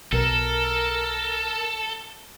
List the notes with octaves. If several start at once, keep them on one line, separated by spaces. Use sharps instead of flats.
B1 A4 A#4